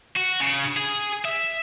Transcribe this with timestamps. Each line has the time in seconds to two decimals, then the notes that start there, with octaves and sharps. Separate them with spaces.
0.17 F#4
0.41 C#3
0.77 G#4
1.25 E5